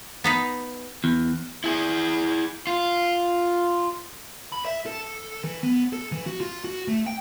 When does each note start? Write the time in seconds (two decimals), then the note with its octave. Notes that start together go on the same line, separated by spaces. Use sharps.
0.24 B3 D#4 B4
1.04 E2
1.64 E4 G#4
2.67 F4
4.52 B5
4.65 E5
4.86 A4
5.44 E3
5.63 B3
5.93 A4
6.12 E3
6.26 F#4
6.40 F4
6.64 F#4
6.88 A3
7.06 G5